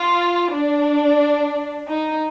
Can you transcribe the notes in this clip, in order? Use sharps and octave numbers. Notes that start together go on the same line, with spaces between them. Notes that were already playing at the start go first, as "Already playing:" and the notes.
Already playing: F4
D4
D#4